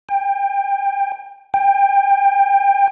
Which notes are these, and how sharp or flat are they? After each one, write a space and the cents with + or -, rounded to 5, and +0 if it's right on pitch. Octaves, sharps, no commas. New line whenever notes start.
G5 +25
G5 +25